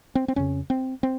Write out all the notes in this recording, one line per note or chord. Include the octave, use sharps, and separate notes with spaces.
C4
C4
F2 C#3 C#4
C4
C4